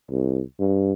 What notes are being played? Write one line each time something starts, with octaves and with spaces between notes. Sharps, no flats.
C2
G2